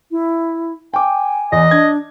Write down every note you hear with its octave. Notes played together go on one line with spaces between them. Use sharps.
E4
G5 G#5 D6
E2 D#5
D4 G#6